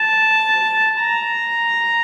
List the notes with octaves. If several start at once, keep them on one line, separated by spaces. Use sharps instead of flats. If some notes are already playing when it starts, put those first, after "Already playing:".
Already playing: A5
A#5